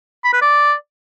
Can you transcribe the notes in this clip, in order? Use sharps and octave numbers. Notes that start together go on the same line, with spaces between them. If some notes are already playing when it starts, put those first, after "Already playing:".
B5
B4
D5